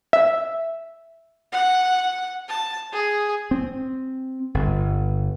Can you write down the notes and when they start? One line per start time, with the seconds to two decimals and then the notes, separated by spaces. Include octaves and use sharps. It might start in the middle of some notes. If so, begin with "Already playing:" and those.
0.13 E5
1.52 F#5
2.49 A5
2.93 G#4
3.51 C4
4.54 G1